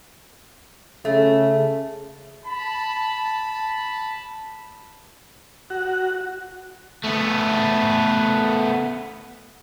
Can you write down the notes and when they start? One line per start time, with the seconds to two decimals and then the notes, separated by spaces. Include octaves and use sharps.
1.05 C#3 A3
2.45 A5 B5
5.70 F#4
7.04 A3 B3